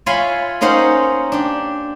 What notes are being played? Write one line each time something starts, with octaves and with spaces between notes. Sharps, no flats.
F4 C#5 E5 G#5 B5 C6
A#3 C#4 D#4 C5 F#5
D4 G4